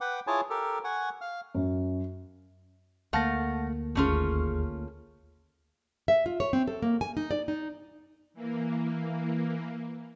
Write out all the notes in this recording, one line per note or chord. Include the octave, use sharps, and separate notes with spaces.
B4 F#5 G5 D6
E4 F4 G#4 C#5 G#5 A5
G4 A4 A#4
F#5 G#5 C#6
F5 F6
F#2
D2 A3 A#3 F5 F#5 A5 A#6
G#1 D#2 A3 C#4 F4 G#4
E5
F4
C#5
C4
A4
A#3
G#5
D#4
D5
D#4
E3 A#3